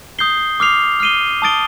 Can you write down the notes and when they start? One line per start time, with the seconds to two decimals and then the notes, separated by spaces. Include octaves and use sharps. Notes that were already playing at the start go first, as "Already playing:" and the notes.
0.19 D#6 G6 C7 G7
0.60 D6 F6 C7 F7
1.00 F6 C7 D#7 G7
1.42 A5 D#6 A6 D7 G7